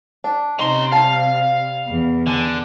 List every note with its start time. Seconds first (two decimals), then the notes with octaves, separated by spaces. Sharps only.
0.24 D4
0.59 C3 C#4 D#4 C6
0.92 G3 F5 A5
1.88 E2
2.27 D3 G#5